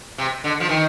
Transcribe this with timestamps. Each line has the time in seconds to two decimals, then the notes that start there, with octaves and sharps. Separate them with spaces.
0.18 C3
0.44 D3
0.60 F3
0.69 D#3